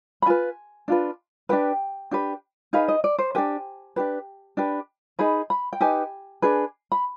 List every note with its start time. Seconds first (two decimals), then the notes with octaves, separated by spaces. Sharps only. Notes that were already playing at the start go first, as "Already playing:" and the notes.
0.22 B5
0.26 F4 B4 G#5
0.88 D4 F4 B4
1.49 D4 G4 B4 G5
2.11 D4 G4 B4
2.73 D#4 G#4 B4 F5
2.88 D#5
3.04 D5
3.18 C5
3.35 D4 G4 B4 G#5
3.96 D4 G4 B4
4.57 D4 G4 B4
5.19 D#4 G#4 B4 B5
5.50 B5
5.73 G5
5.81 D#4 G4 B4 G#5
6.42 D4 G#4 B4
6.92 B5